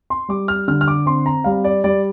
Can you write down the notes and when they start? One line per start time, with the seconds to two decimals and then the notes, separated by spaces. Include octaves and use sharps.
0.10 C6
0.29 G3 D6
0.48 F6
0.68 D3 F6
0.81 F6
0.88 D6
1.06 C4 C6
1.26 A#5
1.44 G3 F5
1.64 D5
1.84 G3 D5